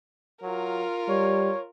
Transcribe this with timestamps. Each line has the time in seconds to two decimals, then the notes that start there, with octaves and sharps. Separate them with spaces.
0.42 F#3 F4 A#4
1.09 G3 C#5